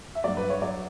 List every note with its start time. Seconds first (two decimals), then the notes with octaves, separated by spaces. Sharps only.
0.15 E5
0.24 G2 F#3 D5
0.37 B4
0.50 C#5
0.62 F#3 D5